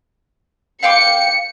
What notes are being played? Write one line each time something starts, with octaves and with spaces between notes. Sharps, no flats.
F5 G5 D6 C#7